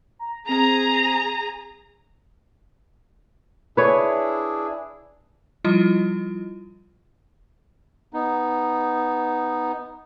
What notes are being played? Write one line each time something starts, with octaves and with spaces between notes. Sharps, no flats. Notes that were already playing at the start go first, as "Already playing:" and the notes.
A#5
C4 G#4 A#5
D4 E4 G#4 B4 C#5
F3 G3 E4 F4 D#5
B3 D#4